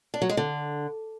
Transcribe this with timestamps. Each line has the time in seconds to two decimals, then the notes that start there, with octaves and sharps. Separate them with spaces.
0.14 D4
0.22 F#3
0.29 G#3
0.37 D3